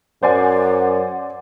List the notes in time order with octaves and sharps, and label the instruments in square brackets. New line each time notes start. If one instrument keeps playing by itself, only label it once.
[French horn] F#2 [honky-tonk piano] C5 D5 G#5 [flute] F#5